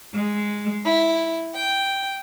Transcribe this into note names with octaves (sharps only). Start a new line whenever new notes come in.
G#3
E4
G5